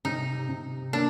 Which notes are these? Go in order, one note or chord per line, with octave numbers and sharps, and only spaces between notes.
C3 D#4
C3
A#3 D4